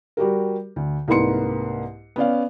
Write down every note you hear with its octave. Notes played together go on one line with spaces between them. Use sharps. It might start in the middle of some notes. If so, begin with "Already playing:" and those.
G3 F#4 G4 A#4
D2
C2 G#2 A#3 B4 C6 C#7
B3 C#4 D5 F5